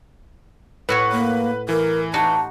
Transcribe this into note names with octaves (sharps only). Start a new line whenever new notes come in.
A2 F#4 B4 C#5
A#3
E3 A#4
D#4 F#4 G4 A5